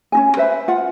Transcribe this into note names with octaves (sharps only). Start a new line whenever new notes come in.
C#4 D#4 G#5
B4 C5 E5 B5
F4 F#5